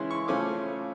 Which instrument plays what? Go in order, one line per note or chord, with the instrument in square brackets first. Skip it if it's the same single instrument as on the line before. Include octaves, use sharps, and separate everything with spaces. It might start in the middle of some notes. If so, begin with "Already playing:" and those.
Already playing: [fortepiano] C#3 E3 G#3 C#4 E4 C6
C#6
C#3 F3 A3 C#4 D6